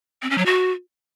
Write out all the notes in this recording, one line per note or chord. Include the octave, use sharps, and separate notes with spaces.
C4
C#4
F#3
F#4